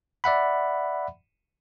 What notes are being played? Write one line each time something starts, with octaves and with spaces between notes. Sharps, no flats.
D5 E5 F#5 B5